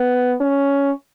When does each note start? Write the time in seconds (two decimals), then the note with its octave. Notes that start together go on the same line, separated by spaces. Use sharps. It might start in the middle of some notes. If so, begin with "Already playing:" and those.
Already playing: B3
0.40 C#4